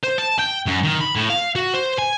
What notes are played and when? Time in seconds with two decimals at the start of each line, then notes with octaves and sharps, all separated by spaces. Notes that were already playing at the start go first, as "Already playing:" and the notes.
0.04 C5
0.18 A5
0.39 G5
0.66 F#2
0.83 D#3
1.01 B5
1.15 A2
1.30 F5
1.56 F#4
1.74 C5
1.98 G#5